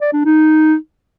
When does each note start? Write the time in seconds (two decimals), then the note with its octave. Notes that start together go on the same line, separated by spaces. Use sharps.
0.01 D5
0.13 D4
0.25 D#4